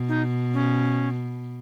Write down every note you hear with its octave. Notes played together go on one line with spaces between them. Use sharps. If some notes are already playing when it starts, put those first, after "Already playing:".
Already playing: B2
D#4
C#4